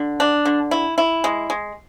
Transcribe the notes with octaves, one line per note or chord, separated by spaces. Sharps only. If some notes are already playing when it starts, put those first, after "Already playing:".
Already playing: D3
D4
D3
E4
E4
G#3
G#3